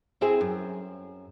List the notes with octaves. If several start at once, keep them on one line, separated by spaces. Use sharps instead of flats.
C4 E4 G#4
F#2